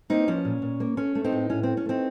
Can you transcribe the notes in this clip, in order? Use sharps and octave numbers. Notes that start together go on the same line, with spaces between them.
A#3 C4 D#4
F3 C#4
A#2
A#2
A#3
A3 C#4
A3
C4 D#4
A2
A2 C#4
A3 C4
C#4
A3 C4 D#4